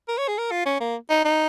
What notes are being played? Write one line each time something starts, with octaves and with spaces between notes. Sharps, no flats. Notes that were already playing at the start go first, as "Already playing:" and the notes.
A#4
C#5
G#4
A#4
F4
C#4
A#3
D#4
D#4